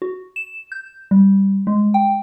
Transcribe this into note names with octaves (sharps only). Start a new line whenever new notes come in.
F#4
E7
G6
G3
G#3
G5